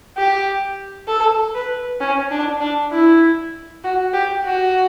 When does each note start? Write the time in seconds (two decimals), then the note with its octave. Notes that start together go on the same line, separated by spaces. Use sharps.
0.17 G4
1.08 A4
1.55 B4
2.01 C#4
2.31 D4
2.61 D4
2.91 E4
3.84 F#4
4.14 G4
4.45 F#4